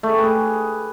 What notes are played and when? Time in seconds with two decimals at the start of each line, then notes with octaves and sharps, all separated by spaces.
0.03 A3
0.08 G#4
0.13 G4
0.19 B4
0.24 G#4